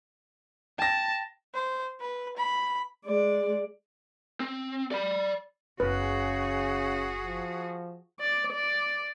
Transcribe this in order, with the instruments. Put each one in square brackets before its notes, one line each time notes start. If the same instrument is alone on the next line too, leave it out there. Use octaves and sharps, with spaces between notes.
[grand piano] G5 A#6 [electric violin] A5
[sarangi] C5
B4
B5
[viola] G#3 D5
[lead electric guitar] C4
D5 B5
[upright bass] F#1 [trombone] C#3 [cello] F#4 G#4 [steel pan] B4
[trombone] F3
[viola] D5
D5